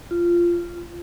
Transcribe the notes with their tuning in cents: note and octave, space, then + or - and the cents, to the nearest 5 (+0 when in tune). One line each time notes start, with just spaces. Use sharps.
F4 -15